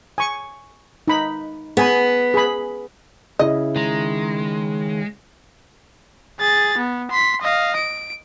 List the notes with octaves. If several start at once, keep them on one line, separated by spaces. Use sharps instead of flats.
G#5 C#6
D#4 B5
B3 G#4 G#5 B5
G#4 B5
C#3 E4 D#5
D#3 G#3 A#5
G#4 A6
B3
C6 B6
D#5 F5
D7